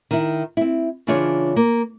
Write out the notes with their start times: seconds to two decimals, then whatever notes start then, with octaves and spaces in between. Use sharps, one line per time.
0.11 D#3 E4
0.57 C4 E4
1.07 C#3 E3 D4 F4 G#4 C#5
1.56 A#3